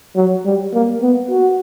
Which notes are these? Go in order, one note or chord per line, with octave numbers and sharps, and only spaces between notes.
F#3
G3
A#3
B3
F#4